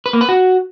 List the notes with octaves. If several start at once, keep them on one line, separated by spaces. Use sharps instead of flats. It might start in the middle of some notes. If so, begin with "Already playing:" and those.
B4
A#3
B4
F#4